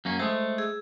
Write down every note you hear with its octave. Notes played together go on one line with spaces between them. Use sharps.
F#2 A#3 C#4
G#3 A3 C5
G#4 E6